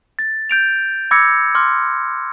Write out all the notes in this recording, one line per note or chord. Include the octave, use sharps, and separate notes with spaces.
A6
G6 D7 F7
B5 D6 E6 G#6 A#6 C#7
C6 D6 F6